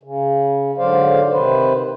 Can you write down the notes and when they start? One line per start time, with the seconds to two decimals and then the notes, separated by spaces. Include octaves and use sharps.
0.03 C#3
0.77 G#2 D3 F#3 C5 D5 F5
1.31 C3 D#3 B4 C5